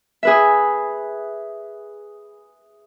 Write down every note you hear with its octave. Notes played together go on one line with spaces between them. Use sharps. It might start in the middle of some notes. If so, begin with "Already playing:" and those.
G#4 B4 E5